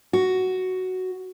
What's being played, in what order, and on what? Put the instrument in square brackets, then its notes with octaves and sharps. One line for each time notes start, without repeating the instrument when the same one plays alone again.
[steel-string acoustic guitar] F#4